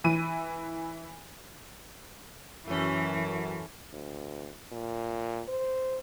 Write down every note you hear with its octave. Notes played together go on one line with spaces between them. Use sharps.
E3 D#7
F#2 E3 A3 C#4
D2
A#2
C5